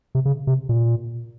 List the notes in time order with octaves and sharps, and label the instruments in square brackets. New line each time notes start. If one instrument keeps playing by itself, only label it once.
[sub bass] C3
C#3
C3
A#2